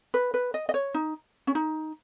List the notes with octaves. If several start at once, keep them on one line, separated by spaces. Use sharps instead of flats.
B4
B4
D#5
D#5
C#5
D#4
C#4
D#4